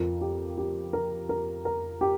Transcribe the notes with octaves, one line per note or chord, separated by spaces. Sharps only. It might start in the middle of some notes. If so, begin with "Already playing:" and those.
Already playing: F2 F3 A#4
G4
G4
A#4
A#4
A#4
G4